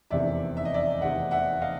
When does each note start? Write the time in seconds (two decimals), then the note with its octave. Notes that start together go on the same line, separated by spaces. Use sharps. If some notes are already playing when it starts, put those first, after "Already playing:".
0.10 F1 E2 C3 D#3 D5 E5
0.57 E5
0.65 D#5
0.74 D5 E5
1.01 F1 E2 C3 D#3 E5 F#5
1.31 E5 F#5
1.62 D#5 F5